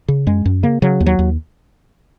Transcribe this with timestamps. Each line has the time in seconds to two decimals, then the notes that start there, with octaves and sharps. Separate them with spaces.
0.08 C#3
0.27 F#2 G#3
0.46 F#2
0.63 C#3 A#3
0.82 C#3 F#3
1.00 D#2
1.06 F#3
1.19 D#2